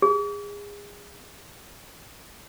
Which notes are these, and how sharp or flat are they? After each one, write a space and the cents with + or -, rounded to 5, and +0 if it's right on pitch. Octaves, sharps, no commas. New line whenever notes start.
G#4 -25